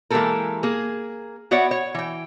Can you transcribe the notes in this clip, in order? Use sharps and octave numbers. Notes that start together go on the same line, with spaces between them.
E3 G#3 A#3 G4 A4 A#4
A#3 G#4
B3 F#4 C#5 D5 E5 F#5
C#5
E3 G5